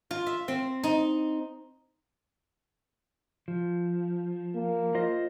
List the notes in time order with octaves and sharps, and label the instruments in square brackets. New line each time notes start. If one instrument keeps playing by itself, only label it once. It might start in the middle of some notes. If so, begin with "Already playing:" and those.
[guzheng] F4
E5
C4
D#4
[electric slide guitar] F3
[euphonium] A#3
[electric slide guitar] F4 C5 D#5